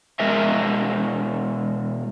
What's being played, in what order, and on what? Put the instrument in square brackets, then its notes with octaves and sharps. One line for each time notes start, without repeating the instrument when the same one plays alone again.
[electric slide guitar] B2 G#3 A#4 D#5 E5